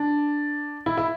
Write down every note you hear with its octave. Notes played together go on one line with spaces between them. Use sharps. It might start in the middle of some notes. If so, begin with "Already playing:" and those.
Already playing: D4
E4
E4